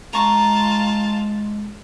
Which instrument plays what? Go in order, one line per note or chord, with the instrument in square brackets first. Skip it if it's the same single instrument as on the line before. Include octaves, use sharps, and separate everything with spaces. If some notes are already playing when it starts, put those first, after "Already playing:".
[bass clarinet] G#3 [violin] F4 A5 [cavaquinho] A#5 C#6